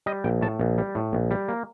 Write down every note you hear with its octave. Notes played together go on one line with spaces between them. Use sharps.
G3 D#5
A#1 G5
A2 A5
A#1
G3
A2
A#1
G3
A#3